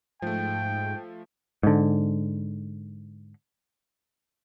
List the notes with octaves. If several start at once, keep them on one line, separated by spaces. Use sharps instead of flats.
G#2 F3 A3 G5
G#2 D3